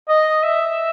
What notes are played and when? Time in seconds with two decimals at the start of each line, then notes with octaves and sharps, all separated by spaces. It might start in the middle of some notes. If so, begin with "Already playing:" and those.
0.09 D#5
0.44 E5